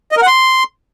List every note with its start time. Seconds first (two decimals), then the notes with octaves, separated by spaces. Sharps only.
0.12 D#5
0.17 A#4
0.22 F#5
0.27 C6